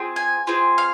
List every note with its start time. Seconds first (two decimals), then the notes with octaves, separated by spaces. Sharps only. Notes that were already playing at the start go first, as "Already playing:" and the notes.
Already playing: C4 F4 G#4
0.16 G#5
0.47 C4 F4 G#4
0.78 F5